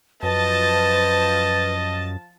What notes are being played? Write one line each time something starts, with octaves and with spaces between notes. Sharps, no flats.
F#2 F3 B4 D#5 A5